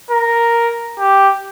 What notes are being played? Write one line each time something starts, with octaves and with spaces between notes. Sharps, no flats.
A#4
G4